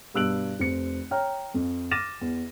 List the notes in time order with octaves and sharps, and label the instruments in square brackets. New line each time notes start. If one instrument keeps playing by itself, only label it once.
[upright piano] G2 B2 E6 F#6 D7 F#7
F1 C4 C#7
C#5 G5 A#5 F6
F2
D6 F6 A6 A#6 D#7 E7
E2